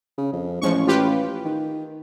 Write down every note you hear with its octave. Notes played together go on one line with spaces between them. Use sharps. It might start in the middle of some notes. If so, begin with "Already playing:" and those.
C#3
F2
A1 F3 G#3 C#6
F4 G4 B4
D#3